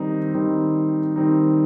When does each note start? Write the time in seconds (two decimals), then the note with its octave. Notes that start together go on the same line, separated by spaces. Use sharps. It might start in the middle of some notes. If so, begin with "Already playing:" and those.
Already playing: D#3 G3 C4 D#4
0.34 D#3 G3 C4 D#4
1.16 D#3 G3 C4 D#4